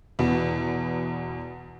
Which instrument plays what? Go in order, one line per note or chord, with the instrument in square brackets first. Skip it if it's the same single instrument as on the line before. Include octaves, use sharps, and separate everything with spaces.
[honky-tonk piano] E2 B2 B3